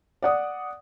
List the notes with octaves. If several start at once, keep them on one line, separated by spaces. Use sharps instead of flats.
D5 F#5 D#6